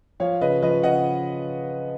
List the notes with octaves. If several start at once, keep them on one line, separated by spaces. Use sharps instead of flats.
F3 C#5 F5
C#3 B4 D#5
F3 B4 D#5
C#3 D#5 F#5